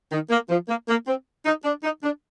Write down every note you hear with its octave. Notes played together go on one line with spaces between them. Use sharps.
D#3
A#3
F3
A#3
A#3
C4
D#4
D4
D#4
D4